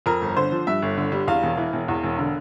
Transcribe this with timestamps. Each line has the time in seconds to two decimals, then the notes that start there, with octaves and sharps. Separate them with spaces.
0.06 F2 A#4
0.21 G1
0.36 D3 C5
0.52 F3
0.67 G2 E5
0.82 G1
0.97 D3
1.12 G3
1.27 E2 F5
1.43 E1
1.57 E3
1.73 E1
1.88 E2
2.03 E1
2.18 D3